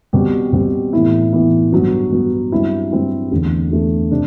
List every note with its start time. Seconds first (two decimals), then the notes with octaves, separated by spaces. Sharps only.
0.13 B2 G3 C4 G4
0.53 B2 G3 C4 G4
0.93 A2 E3 B3 E4
1.33 A2 E3 B3 E4
1.72 G2 F#3 B3 F#4
2.12 G2 F#3 B3 F#4
2.52 G2 F#3 C4 E4
2.91 G2 F#3 C4 E4
3.32 E2 D3 A3
3.71 E2 D3 A3
4.12 C3 D4